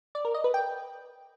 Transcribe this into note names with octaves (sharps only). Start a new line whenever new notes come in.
D5
A#4
D#5
B4
G5